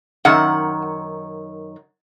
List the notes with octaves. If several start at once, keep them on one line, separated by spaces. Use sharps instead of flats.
F#2 D#3 F#5